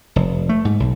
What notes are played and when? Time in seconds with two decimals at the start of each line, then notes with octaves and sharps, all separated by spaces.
0.16 F1
0.49 A3
0.65 G#2
0.80 B1